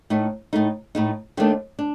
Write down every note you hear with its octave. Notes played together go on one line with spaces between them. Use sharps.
A2 A3 D#4
A2 A3 D#4
A2 A3 D#4
D#2 D#3 A3 D4
D4